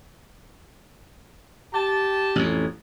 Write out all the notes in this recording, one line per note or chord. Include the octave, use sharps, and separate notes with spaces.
G4 A5
A1 F2